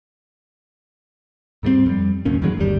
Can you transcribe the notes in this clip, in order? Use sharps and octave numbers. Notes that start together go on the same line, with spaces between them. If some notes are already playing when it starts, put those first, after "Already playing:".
G#2 G3 A3 C4
F2 G3
D2 G#2 A#3 C#4
F2 D#3 F#3 G#3
G1 D#2 A#2 G3